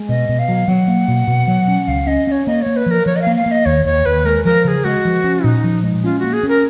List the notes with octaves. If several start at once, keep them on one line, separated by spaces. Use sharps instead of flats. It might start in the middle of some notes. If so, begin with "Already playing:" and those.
Already playing: G#3
B2 D#5
B2
F5
F#3
F#3 F#5
A#3
B2
B2
F#3
C#4
C#2 F5
C#4 D#5
C#4 C#5 D#5
A#3 D#5
A#3 C#5
B4
F3 A#4
F3 C#5
D#5
F5
A#3
F5
A#3
D#5
D#2 C#5
D#2 C#5
D#2 B4
G#3 A#4
F3 A#4
C#3 G#4 A#4
G#3 F#4
F3
C#4
A#2 D#4
F3
G#3
C#4 F4
A#3 F#4
G#4
C#4 A#4